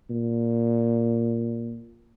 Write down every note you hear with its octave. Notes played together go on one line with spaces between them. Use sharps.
A#2